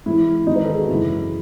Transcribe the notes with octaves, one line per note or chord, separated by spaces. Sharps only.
G#2 E3 E4
G#2 D#3 D#4
B4
A4
G#4
F#4
F#2 C#3 E3 E4